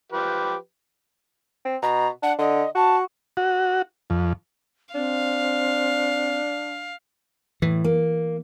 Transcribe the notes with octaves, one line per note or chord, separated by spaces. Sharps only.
F3 G4 B4
C4
B2 A#5
D4 F#5
D3 D#5
F#4 A5
F#4
F2
C4 D4 F5
A2 E3
A#3